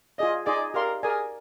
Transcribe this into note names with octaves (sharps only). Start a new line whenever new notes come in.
F4 G#4 D5 D#5
D#4 G#4 D5 D#5 G#5 C6
G4 A#4 D5 F5 C6
G#4 A#4 D5 G#5